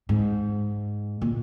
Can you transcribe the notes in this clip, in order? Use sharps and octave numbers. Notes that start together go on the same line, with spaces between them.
G#2
A#2